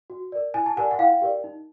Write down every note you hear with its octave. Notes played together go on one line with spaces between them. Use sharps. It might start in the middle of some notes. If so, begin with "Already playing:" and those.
F#4
A#4 D5
E4 G#5
A5
G4 A#4 D5 F#5 G#5
F#5
E4 F5 G5
G4 A#4 D5
D#4